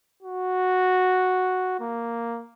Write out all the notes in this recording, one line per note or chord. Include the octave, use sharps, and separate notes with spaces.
F#4
A#3